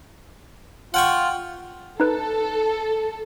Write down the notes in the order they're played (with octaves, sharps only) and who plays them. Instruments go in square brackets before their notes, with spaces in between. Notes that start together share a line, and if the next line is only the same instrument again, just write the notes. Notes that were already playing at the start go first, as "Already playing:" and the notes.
[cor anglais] F4 [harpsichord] F#5 G5 C#6
[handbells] D#4 B4 [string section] A4